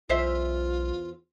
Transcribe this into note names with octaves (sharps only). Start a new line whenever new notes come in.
B1 E2 F4 C5 E5